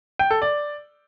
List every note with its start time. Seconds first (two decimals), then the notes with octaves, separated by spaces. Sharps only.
0.19 G5
0.31 A4
0.42 D5